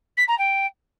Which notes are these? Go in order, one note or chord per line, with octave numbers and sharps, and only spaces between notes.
B6
A#5
G5